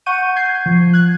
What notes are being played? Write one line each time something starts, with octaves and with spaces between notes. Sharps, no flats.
F#5 C#6 G6 D#7
G6 G#6 C7
F3
F#6 G#6